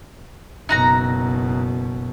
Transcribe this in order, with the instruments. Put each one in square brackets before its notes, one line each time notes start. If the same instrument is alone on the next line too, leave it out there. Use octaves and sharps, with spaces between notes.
[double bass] F#1 B2 [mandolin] D#4 F#4 A#5